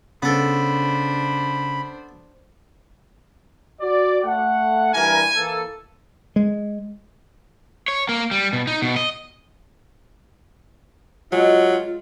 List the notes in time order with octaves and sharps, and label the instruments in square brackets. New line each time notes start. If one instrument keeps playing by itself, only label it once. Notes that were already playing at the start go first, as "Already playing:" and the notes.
[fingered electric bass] C#3 [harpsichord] B3 A4 [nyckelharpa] D4 C5 [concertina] B5
[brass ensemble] F#4 D5
A3 F#5
[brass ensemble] G2 E3 A#4 [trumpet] G#5
[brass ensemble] E3 A#3 A4
[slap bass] G#3
[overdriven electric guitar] C#5
A#3
G3
B2
D#4
B2
D#5
[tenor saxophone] F#3 [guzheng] G#3 [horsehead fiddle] F4